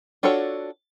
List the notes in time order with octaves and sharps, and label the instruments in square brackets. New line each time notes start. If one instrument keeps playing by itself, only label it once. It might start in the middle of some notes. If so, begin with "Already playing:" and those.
[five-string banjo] D4 F4 F#4 A4 C#5